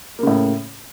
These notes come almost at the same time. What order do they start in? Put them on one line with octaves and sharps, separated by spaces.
A#3 C#3 A2